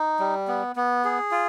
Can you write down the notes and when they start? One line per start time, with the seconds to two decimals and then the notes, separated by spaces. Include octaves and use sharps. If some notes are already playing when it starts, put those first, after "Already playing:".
Already playing: D#4
0.20 G3
0.48 B3
0.76 B3
1.05 G#4
1.32 F4